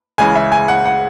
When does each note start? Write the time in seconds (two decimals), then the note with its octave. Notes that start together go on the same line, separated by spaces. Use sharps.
0.18 C#2 C#3 E3 G#3 G#5
0.35 E5
0.52 G#5
0.68 F#5
0.85 F#5